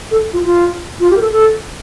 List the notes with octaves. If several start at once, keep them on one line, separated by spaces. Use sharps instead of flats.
A4
F4
F4
F4
G4
A#4
A4
A4